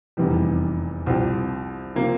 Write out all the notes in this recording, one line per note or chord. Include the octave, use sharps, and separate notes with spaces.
F1 E2 C3 E3 G3
C2 C3 F3 C4 G4
C3 F3 A#3